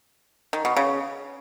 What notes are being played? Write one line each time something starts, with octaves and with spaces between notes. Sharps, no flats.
D#3
B2
C#3